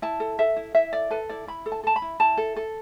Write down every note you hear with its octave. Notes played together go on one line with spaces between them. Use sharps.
E4 A5
A4
A4 E5
E4
E4 E5
A4 D5
A4 B4
E4 D5
E4 B5
A4
A5
A4 A5
B5
E4
E4 A5
A4
A4